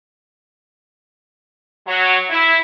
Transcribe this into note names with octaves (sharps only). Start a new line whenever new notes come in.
F#3
E4